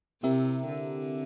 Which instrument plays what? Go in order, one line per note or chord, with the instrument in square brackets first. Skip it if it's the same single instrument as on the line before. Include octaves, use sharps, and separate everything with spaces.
[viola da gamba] C3 [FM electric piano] C4 E4 G4 A#4 E5
[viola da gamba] D3